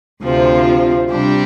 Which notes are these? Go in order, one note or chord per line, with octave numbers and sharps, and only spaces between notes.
D2 C3 F3 C4 F4
C3 G3 D4 G4